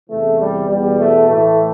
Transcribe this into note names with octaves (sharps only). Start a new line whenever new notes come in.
E2 C3 E3 A3
G3
E2 B2 G3
A3
A2 E3 A3